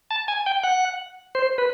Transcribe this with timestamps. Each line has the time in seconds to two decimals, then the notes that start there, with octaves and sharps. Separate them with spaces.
0.11 A5
0.28 G#5
0.46 G5
0.63 F#5
1.35 C5
1.58 B4